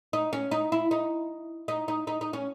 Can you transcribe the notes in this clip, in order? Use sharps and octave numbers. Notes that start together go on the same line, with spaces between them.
D#4
C#4
D#4
E4
D#4
D#4
D#4
D#4
D#4
C#4